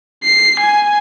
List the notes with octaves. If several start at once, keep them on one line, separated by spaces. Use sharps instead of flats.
C7
G#5